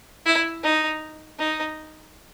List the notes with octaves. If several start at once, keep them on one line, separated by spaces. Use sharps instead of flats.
E4
D#4
D#4